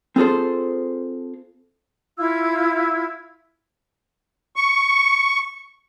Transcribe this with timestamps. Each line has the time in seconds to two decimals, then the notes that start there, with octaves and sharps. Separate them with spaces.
0.16 C4 F4 G#4 A4 C5
2.18 E4 F4 E6 G#6
4.56 C#6